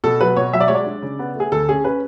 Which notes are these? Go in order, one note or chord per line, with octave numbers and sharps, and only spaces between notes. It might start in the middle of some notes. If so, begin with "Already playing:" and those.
B2 A4
F#3 B4
B2 C#5
F#3 E5
D5
G#3 C#5
D5
D4
C#3
B3
A3 G#4
D2 A4
C#4 G#4
C#4 B4